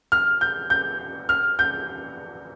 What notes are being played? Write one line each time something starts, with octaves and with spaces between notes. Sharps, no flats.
F6
G6
G6
F6
G6